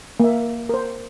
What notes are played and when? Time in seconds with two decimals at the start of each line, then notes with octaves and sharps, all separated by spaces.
0.20 A#3 E5
0.69 A#4 C5